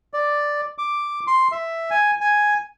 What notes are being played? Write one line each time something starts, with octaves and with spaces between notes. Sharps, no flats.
D5
D6
C6
E5
G#5
G#5